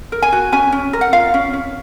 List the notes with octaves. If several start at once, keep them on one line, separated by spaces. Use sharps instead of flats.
A#4
G#5
F#4
C#4 G#5
C#4
A#4
F#5
F4 F5
C#4
C#4